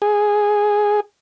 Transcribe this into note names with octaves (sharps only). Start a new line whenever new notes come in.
G#4